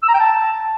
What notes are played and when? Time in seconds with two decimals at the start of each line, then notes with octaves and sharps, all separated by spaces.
0.03 E6
0.08 A#5
0.14 G5
0.20 A5